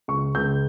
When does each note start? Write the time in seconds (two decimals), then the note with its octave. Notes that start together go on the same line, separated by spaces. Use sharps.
0.08 C#2 C#6
0.35 C#2 G6